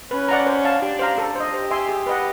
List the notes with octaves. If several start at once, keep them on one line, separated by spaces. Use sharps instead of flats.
C#4 B4
D5 F#5 A#5
C5
F5 A5
D4 G4
C5 F5 A#5
A4
C5 D#5
G4 C5
E5 G#5 C6
G#4
B4 D#5 F#5